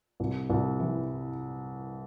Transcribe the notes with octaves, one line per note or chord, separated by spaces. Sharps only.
C2
C2
E3